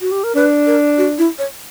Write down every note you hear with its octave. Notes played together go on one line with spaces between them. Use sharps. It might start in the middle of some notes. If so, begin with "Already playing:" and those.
F#4
G4
A#4
D4 B4
A#4
F#4
E4
C#5